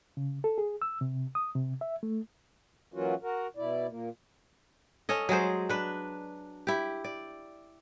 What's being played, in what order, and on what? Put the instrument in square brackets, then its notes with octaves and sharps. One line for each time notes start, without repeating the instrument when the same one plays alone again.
[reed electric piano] C#3
A4
G#4
E6
C3
D#6
C3
E5
A3
[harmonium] E3 F#3 A#3 C#4 F4 F#4
F#4 A#4
B2 E4 D5
A#2 A#3
[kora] C#4 A4 D#5
F#3 G#3 G#4 C5
D4 B4
E4 G4
D5